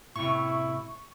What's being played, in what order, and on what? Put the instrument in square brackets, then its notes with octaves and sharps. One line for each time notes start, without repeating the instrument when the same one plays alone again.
[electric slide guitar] A2 C3 [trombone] E4 [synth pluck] C#6